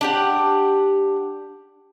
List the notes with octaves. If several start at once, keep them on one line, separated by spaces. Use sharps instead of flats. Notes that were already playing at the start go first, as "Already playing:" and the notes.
D4 G4 F#5